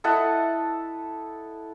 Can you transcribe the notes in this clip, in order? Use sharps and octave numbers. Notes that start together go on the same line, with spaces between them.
E4 A4 D#5 F#5